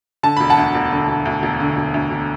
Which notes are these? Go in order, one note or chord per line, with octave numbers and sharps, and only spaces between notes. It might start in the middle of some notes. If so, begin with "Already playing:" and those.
D3 A5
E1 B5
F#5 A5
D2
E1
D3
E1
D2
E1
D3
E1
D2
E1